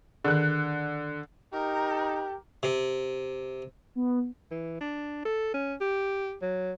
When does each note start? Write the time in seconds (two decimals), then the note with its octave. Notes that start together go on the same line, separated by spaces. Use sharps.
0.25 D3 D#3 G#4 F#6
1.53 D#4 G4 A#4
2.63 C3
3.95 B3
4.51 E3
4.81 D4
5.25 A4
5.54 C#4
5.81 G4
6.42 F#3